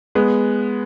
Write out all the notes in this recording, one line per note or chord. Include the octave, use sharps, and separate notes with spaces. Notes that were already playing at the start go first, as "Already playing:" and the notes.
G#3 B3